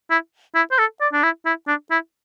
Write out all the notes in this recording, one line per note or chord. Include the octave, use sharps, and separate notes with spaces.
E4
E4
C5
A4
D5
D4
E4
E4
D4
E4